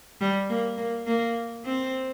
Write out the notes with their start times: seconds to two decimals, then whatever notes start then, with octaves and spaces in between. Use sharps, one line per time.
0.21 G3
0.50 A#3
0.78 A#3
1.07 A#3
1.65 C4